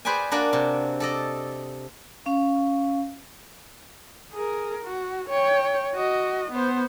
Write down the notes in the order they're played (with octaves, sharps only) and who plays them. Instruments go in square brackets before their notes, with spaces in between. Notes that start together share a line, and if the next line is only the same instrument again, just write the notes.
[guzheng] G#4 B4 C5 D5 G5 G#5
A#3 D4 F#4 D5
C3
A4 D5 D#5
[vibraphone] C#4 F5
[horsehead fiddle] G#4 A#4
F#4
C#5 G5
F#4 D#5
B3 C5